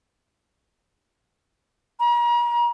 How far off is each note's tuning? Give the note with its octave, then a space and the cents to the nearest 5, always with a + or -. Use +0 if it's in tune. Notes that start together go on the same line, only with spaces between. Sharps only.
A#5 +40